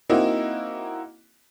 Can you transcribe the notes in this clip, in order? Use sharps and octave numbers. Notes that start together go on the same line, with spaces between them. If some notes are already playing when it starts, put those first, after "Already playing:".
A#3 C4 D#4 E4 F#4